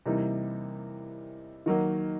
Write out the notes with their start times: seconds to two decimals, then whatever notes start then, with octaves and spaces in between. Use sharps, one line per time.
0.06 C3 E3 G3 A#3 D#4
1.66 D#3 F#3 A#3